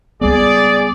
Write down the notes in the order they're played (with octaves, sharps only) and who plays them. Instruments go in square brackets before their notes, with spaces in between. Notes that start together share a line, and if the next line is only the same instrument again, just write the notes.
[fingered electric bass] C#2 G3 B3 [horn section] G#4 D5